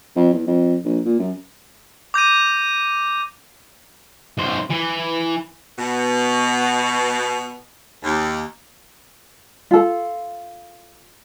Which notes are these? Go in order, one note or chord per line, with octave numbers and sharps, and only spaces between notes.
F2
E2
F2
A#1
A#2
F#2
D6 G6 A#6 D#7
B1 C5
E3
B2
D#2
F4 A4